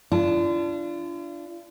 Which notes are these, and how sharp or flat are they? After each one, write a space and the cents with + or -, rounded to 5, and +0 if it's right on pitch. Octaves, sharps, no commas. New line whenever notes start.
D4 -10 F4 -40 A5 +0